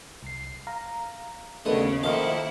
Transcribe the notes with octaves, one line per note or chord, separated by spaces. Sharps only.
C2 C7
F5 A#5
D#2 C#3 A3 B3 D4 A4 B4 D#6
D#3 F3 A#3 E4 A4 F5 F#5 D6